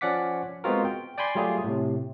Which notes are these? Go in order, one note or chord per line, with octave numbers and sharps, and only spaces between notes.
F3 C#4 D5 F#5 D6 B6
G#3 B3 C4 F4 F#4 A#4
G5
D5 G5 G#5 B5 C6
F#3 G3 A3 F4 G4 G#4
A2 C3